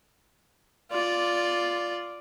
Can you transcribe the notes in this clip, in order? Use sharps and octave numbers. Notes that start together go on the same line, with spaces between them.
F4 D5